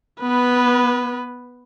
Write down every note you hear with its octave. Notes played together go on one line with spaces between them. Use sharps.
B3 B4